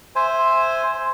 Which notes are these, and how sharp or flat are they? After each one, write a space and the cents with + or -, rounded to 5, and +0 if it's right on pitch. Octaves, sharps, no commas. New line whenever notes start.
C5 +0 E5 +0 G#5 +0